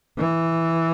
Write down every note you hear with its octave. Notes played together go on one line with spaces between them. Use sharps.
E3